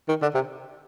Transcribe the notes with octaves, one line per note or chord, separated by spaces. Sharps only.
D#3
D3
C3